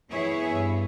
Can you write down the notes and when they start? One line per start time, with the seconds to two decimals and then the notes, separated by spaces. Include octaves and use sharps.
0.10 E3 B3 E4 G#4 C#5 E5
0.51 G2